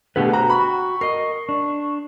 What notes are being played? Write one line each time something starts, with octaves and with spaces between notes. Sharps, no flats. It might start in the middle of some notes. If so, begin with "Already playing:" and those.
B2 D3 A3 G4 G#4 B4 G5
F#4 C5 F#5 G5 A#5
B5 C#6
A#4 D#5 C7
D4